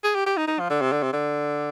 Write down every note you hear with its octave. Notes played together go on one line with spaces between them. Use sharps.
G#4
G4
G4
D#4
D#4
F3
D3
C3
D3
C3
D3